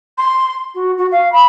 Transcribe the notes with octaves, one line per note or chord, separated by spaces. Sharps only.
C6
F#4
F#4
F5
B5